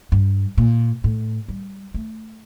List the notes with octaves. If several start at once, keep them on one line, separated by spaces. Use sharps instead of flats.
G2
A#2
A2
G3
A3